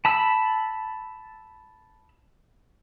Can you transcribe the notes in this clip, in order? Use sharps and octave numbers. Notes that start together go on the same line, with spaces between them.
A5 B5 E6